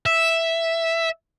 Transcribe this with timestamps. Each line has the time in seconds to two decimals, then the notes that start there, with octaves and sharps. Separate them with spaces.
0.06 E5